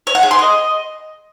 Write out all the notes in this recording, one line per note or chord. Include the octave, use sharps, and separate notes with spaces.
C#5
F#5
G#4
C6
D#5